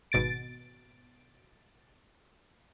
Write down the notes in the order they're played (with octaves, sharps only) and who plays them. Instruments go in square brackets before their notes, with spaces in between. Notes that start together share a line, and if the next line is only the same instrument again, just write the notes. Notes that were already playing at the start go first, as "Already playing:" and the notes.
[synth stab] G#1 B2 A6 D7